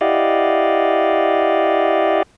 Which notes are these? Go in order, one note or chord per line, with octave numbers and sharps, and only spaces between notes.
E4 G4 D5 D#5 F5 F#5